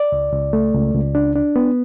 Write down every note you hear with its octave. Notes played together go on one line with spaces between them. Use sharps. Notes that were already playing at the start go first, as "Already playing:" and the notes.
Already playing: D5
C#2
C#2
A3
C#2
C#2
D4
D4
B3